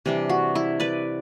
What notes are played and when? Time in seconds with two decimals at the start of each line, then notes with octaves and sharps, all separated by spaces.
0.06 C3 E3 G3 D4
0.29 F#4
0.55 E4
0.80 B4 D5